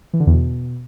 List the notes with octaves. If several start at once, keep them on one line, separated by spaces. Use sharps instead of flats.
E3
D3
E2
B2